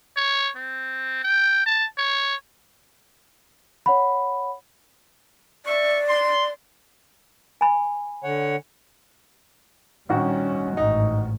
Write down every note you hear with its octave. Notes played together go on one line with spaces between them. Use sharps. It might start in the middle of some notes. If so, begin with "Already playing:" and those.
C#5
C4
G5
A5
C#5
C#5 F#5 B5
D5 E5 C#6
C6
G#5 B5
D3 C#5 F#5
A#1 D#3 G3 C#4 F#4
A1 G#2 D#4